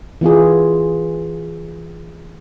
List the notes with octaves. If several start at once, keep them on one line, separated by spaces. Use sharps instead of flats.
E3 B3 F4 G#4